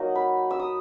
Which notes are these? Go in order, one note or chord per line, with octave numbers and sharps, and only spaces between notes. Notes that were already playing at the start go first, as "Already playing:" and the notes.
Already playing: F#3 A#3 D#4
B5
E6
D#6